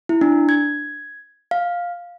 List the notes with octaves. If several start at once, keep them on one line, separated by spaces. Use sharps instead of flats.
E4
D4
G#6
F5